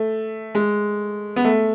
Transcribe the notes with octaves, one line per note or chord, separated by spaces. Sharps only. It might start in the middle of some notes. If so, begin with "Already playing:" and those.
Already playing: A3
G#3
B3
A3